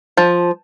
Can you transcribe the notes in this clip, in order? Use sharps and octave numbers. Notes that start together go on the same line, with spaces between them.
F3